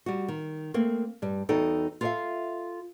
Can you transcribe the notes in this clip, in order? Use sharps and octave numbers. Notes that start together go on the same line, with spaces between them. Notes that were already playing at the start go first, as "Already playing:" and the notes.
G3 F#4
D#3
A3 A#3 C4
G2 G3
E2 D#4 F#4 A4 G5
F4 A4 B4 D5 E5 F5